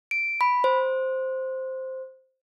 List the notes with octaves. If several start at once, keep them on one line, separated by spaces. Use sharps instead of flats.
D7
B5
C5